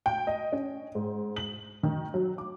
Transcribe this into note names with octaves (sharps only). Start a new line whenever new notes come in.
G5
D#5
C#4
G#2
F#7
D#3
F#3
D6